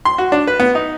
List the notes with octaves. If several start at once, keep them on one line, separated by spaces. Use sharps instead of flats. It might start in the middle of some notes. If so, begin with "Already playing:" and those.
C6
F#4
D4
B4
B3
D#4